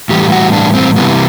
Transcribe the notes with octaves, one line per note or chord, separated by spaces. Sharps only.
A2 E3 G3 G4
F#4
D4
C4
C3 E3 G3 B3